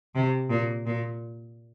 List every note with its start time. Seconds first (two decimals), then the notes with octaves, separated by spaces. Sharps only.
0.15 C3
0.50 A#2
0.86 A#2